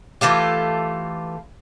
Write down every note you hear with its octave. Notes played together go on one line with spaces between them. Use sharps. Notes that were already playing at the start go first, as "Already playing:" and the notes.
E3 A3 F4 G4